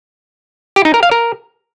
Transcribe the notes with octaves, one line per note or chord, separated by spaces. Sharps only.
G4
D#4
A#4
F5
A#4